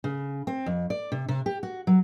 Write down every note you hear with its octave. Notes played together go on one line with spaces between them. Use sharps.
C#3
C4
F2
D5
C3
C3
G4
F#4
F#3